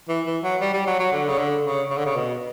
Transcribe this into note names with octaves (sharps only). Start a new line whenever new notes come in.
E3
E3
F#3
G3
G3
F#3
F#3
D3
C#3
D3
C#3
C#3
D3
C#3
B2